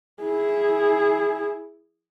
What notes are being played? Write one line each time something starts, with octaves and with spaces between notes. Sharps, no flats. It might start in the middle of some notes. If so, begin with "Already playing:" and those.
E4 G#4